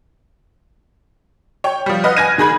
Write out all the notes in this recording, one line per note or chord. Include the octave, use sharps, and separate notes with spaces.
C#5 G5
F3 G3
B4 D#5 F#5 F6
G#5 F6 G#6 A#6 D#7
D#3 G#4 B5 G#6